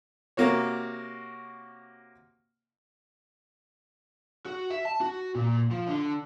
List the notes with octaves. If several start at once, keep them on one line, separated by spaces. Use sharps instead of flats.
C3 A#3 F#4 C#5
F#4
E5
A5
F#4
A#2
F3
D3